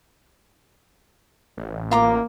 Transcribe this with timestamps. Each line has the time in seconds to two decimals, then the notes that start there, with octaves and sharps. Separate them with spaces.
1.57 A1
1.91 A#3 F4 A#5 D6